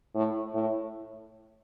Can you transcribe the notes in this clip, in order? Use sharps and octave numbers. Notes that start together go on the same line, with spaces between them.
A2
A2